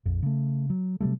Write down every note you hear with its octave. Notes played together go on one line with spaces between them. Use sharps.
A#1 F2
C#3 A3
F#3
C3 F#3 G3 A3